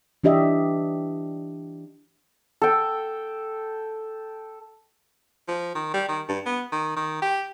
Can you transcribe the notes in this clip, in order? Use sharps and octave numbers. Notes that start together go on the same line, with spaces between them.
E3 D4 G4 D#5 E5
A4 G5
F3
D#3
G3
D#3
G2
B3
D#3
D#3
G4